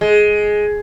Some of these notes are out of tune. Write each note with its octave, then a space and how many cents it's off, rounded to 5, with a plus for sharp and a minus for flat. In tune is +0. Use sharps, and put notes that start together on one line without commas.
G#3 +10